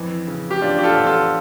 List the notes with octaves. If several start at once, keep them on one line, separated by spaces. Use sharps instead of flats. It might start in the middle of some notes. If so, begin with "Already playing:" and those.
Already playing: F2 E3
C#3
G4
E2 D4 F4
G4
F4 A4
E2
F4 A4